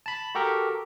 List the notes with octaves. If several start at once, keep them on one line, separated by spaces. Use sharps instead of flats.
A5 B5
F#4 G4 A4 A#4